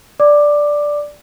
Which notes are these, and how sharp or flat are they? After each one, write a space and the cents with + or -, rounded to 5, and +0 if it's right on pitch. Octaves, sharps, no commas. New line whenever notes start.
D5 +0 D6 +10